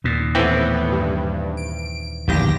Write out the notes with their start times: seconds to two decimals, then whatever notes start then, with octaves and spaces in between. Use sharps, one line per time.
0.04 D#2 A#2
0.35 A2 E3 B3 C4
0.92 G2
1.57 D7
2.28 D1 A#1 E2 D#3 G4 A#6